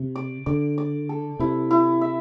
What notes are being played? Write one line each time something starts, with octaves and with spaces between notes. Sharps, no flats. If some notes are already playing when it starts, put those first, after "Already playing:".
Already playing: C3
D5
D3 D5
D5
A4
C3 E4
E4
E5